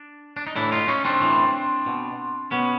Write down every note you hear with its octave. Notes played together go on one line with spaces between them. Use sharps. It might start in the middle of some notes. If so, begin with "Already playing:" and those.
Already playing: D4
D4
D#4
A2 E3 D4 E4
D#4 F4
C#4 D#4
C4 D4
A2 E3
B2
B2 B3 C#4